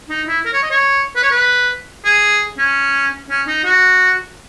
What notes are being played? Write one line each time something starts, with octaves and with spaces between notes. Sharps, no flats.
D#4
E4
A#4
C#5
D#5
C#5
B4
C#5
B4
G#4
C#4
C#4
D#4
F#4